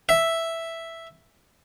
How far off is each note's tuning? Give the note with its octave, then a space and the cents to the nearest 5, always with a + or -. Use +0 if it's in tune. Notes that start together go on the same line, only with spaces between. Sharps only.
E5 +0